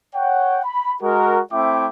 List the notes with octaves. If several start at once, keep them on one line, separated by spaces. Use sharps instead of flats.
C#5 F#5 G5
B5
G#3 F#4 A#4
A3 C4 E4 E5 G5 D6